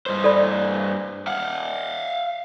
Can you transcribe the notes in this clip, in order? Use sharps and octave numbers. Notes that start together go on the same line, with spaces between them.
G2 C5
A4 D5 B5
F5 F#5